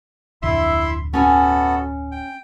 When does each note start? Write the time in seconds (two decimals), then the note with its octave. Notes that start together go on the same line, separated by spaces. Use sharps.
0.42 D1 F2 D3 E4 E5 C6
1.13 B3 C#4 F#4 A4 G#5
2.12 G5